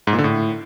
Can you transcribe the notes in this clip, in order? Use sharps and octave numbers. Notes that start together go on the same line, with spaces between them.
G#2
A#2
D3
A2